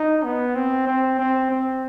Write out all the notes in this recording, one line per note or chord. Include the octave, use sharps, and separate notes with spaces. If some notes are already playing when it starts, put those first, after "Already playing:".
Already playing: D#4
B3
C4
C4
C4
C4